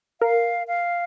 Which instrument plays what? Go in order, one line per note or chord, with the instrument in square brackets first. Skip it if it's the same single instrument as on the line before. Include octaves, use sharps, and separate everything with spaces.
[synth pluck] A#4 [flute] F5
[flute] F5